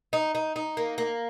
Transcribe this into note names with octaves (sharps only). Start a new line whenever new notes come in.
D#4
D#4
D#4
A#3
A#3